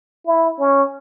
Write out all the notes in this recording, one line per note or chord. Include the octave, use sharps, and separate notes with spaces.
E4
C#4